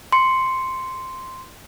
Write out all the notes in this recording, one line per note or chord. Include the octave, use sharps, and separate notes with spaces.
C6 C#7